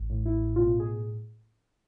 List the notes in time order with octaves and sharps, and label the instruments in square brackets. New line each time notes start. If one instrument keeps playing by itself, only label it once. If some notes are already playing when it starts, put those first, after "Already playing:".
Already playing: [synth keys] A1
A2
E4
B2 F4
G#4